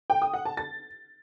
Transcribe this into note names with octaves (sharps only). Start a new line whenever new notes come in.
G5
D#6
F#5
A5
A6